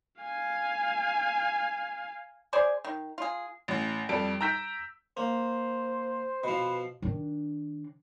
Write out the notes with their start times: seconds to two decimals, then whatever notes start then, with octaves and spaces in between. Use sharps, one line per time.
0.22 F5 G#5
2.53 G#4 C5 D5 G#5
2.84 D#3
3.18 F4 G#4
3.68 A1
4.09 F2 G3 A4 D7
4.41 A#5 E6 G6 B6 D7
5.17 A#3 C5
6.44 B2 F3 B4
7.02 D#3 D4